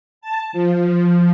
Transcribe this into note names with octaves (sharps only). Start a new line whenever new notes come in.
A5
F3